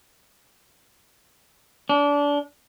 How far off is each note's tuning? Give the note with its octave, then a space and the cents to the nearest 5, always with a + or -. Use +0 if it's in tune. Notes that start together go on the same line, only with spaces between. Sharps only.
D4 -25